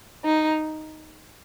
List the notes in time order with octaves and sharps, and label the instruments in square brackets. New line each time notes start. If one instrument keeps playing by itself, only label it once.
[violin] D#4